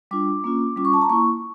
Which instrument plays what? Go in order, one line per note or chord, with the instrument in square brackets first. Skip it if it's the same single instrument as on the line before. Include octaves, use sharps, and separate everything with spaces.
[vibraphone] G3 D4 F4 D6
A#3 C#4 F4
G3 C#4 F4 D6
C#6
A5
A#5
A#3 E4 C#6